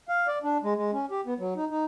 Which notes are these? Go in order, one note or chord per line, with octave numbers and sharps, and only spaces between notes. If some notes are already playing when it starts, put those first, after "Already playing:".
F5
D5
D4
G#3
G#3
C#4
G4
B3
F#3
D#4
D#4